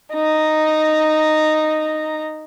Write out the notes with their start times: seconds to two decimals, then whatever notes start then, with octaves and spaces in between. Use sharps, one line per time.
0.14 D#4 A#5